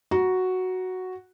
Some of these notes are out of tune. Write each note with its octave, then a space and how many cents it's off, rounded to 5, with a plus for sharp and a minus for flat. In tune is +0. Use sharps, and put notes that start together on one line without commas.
F#4 +0 F#5 +0 A#5 +20